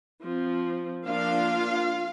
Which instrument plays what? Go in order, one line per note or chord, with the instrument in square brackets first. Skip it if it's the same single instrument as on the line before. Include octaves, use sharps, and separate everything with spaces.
[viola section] F3 C4
F3 A#3 D4 F4 F5